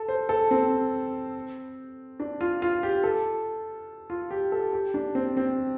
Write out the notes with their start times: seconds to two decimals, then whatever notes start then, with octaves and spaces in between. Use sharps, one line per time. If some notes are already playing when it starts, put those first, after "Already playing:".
Already playing: A4
0.08 C5
0.29 A4
0.51 C4
2.20 D4
2.41 F4
2.62 F4
2.83 G4
3.04 A4
4.10 F4
4.31 G4
4.52 A4
4.73 G4
4.94 D4
5.15 C4
5.37 C4